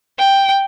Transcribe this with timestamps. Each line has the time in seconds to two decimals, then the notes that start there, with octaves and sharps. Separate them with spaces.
0.19 G5